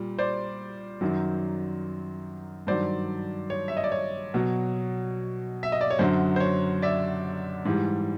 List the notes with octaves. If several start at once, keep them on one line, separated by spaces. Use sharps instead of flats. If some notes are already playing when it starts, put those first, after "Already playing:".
Already playing: A#2 G3
C5 D5
F#2 D#3 F#3
G2 D#3 F#3 C5 D5
C#5
E5
D#5
D5
C#5
B2 F#3
E5
D#5
D5
C#5
F#2 D3 F#3 C5
C5
C#5
D5 E5
G#2 E3 G3